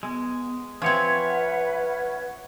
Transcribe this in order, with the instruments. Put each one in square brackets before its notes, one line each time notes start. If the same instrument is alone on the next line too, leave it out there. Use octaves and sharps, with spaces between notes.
[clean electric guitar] G#3 [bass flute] B3
[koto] F3 C4 [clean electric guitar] C#4 C#5 [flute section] B4 E5 [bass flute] F#5